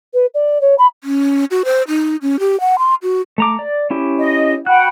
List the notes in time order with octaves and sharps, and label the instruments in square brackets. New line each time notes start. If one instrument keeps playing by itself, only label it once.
[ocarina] B4
D5
C#5
B5
[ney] C#4
F#4
C5
D#4
C#4
G4
F#5
C6
F#4
[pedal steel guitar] A3 A#5 D6
D5
C#4 E4 G4
[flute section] D#5
[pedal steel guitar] F#4 F#6 [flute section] F#5 G5 B5